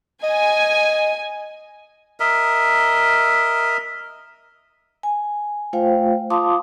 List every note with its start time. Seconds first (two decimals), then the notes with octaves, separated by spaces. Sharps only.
0.23 D#5 G#5
2.20 A#4 D#5 E5
5.03 G#5
5.73 A3 F4 C5 F5 G5
6.30 F4 F5 A5 C6 D6 D#6